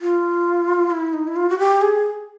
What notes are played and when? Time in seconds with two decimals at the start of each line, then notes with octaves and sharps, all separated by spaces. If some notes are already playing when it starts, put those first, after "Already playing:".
0.01 F4
0.91 E4
1.13 D#4
1.27 E4
1.36 F4
1.50 F#4
1.59 G4
1.82 G#4